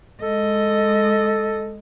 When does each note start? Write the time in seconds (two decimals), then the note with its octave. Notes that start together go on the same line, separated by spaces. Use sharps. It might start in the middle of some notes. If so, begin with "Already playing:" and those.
0.22 G#3 A4 D#5